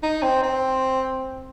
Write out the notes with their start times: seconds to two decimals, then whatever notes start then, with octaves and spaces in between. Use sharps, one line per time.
0.03 D#4
0.23 C4
0.43 C4